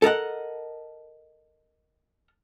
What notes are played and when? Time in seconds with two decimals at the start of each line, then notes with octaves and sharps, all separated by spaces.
0.02 A4 A#4 D#5 F#5